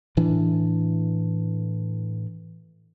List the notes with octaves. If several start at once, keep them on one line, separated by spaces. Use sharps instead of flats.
A2 E3 D4